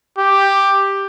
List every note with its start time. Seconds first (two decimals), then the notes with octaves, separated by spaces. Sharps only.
0.18 G4